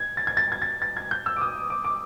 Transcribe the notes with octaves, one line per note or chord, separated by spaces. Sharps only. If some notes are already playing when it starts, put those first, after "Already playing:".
Already playing: G#6
A6
G#6
A6
G#6
A6
A6
G#6
G6
E6
D6
D#6
D6
D6